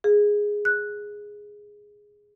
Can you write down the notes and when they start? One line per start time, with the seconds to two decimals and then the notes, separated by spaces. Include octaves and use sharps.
0.04 G#4
0.65 F#6